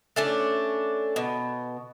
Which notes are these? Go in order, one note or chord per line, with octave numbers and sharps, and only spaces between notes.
A3 C#4 D4
B2